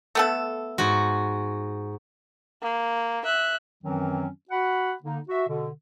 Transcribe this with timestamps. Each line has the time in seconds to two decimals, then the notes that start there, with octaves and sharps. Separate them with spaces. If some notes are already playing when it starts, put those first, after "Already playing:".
0.15 A3 B3 A4
0.78 G#2 F#4
2.62 A#3
3.25 E5 F#6
3.84 F#2 D#3 E3 F#3 C4 C#4
4.49 F#4 F#5 B5
5.03 D3 A#3 D#4
5.28 F#4 E5
5.48 B2 D3